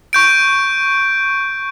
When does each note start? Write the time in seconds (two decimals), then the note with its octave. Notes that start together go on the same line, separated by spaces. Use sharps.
0.13 C#6 G6 D7